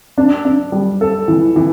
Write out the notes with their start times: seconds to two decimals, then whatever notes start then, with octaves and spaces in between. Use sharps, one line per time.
0.18 D4
0.45 D4
0.72 G3
1.01 A4
1.28 E3
1.56 E3